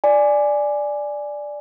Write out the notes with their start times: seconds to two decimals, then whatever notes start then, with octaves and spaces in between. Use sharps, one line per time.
0.04 D5 G#5